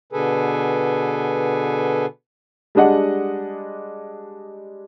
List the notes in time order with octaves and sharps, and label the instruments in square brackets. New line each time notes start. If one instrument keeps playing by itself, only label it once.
[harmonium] B2 D3 G#4 A4 B4
[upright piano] G3 G#3 D4 D#5 F#5